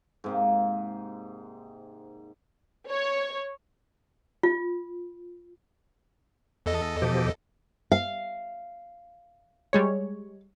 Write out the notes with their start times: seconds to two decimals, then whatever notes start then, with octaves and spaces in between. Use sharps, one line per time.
0.24 G#2 C3 A#3
2.89 C#5
4.43 F4
6.66 E2 A4 D#5
7.02 B2 F3 G4
7.92 F5
9.73 G3 G#3 C#5